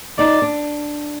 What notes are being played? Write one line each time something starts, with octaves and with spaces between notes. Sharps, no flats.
D#4 D5
D4